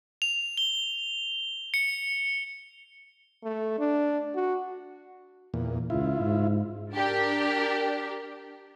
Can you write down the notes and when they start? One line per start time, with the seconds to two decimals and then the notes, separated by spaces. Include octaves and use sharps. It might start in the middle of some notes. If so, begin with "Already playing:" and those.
0.22 F7
0.57 G7
1.74 C#7
3.43 A3
3.79 D4
4.35 F#4
5.54 E2 A#2
5.90 C#2 E4 F4
6.20 G#2
6.92 D4 G4 A#4